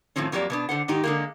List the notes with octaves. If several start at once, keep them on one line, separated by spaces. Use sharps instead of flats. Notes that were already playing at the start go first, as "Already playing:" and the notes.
A2 D#3 F3 C4 C#4
F2 F#3 A#3 G4 D5
B2 B3 D4
D3 C5 F#5
G#2 D#3 D#4 G4
D3 G#3 A#3